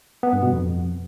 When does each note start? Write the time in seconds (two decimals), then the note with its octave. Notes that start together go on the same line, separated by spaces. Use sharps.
0.23 B3
0.33 G2
0.43 B2
0.52 F2